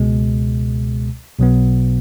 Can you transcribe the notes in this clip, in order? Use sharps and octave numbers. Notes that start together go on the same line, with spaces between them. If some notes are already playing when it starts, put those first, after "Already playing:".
Already playing: C#2 B2 G#3
B1 B2 F#3 B3